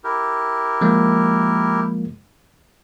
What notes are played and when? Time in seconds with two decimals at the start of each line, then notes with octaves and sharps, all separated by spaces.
0.04 E4 G4 A#4
0.81 F3 G#3 A#3